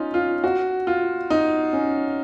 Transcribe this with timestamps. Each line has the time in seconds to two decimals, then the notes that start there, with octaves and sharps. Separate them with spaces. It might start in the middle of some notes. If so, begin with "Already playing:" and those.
Already playing: C#4 D#4 F4
0.14 F4
0.44 F#4
0.87 F4
1.30 D#4
1.73 C#4